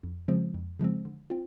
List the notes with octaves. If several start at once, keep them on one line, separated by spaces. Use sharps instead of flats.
F2
C#3 F3 G#3 C4
F2
C#3 F3 G#3 C4
D3
C4 F4